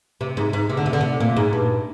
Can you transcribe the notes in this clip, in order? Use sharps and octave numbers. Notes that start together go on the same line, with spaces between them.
C3
G#2
G#2
C3
D3
C3
D3
C3
A#2
G#2
G2